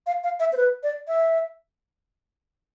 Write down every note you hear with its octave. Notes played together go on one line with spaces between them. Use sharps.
F5
F5
E5
C5
B4
D5
E5